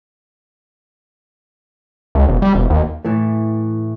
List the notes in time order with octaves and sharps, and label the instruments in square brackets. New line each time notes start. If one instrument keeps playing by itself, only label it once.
[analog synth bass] C#2
E1
G3
E1
D#2
[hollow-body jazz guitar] A2 E3 A3